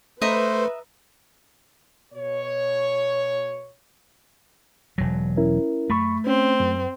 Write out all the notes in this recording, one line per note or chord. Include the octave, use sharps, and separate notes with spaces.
A3 B4 C5 D#5 E5 A#5
B2 C#5
E1 F#3
C#4 E4 A#4
F#2 A3 B5 C#6
C4 C#4
F#2